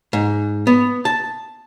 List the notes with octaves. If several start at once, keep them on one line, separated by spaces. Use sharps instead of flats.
G#2
B3
A5